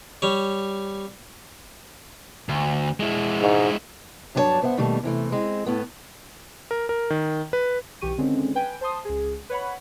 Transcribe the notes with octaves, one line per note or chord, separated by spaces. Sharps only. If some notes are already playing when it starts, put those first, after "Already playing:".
G3 C#5
D2
G#3 E4
G#2
G2 F#3 D4 F4 C#5 A5
G2 B3 C5 E5 F#5
B2 D#3 G3 A3 A#3
C3 E3 A3
G#3 C4
A2 A3 B3
A#4
A#4
D#3
B4
B1 E3 G4 C#6 D#7
D3 D#3 G#3 C4 C#4
B4 G5 G#5
C5 A5 C6 D#6
C#2 G#4
B4 C#5 F#5 B5